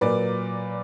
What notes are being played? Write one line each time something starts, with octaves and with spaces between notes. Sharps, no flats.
A#2 F#3 A#3 B4 D5